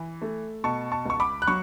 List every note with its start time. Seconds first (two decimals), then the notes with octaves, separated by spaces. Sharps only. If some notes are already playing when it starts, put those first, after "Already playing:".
Already playing: E3
0.22 A3
0.64 B2 A5 C#6
0.92 A5 C#6
1.06 C#2 C#6
1.20 B5 D6
1.42 F#6
1.47 F#3 C#6